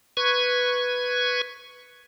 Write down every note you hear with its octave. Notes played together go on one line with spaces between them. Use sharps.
B4 C#6 G#6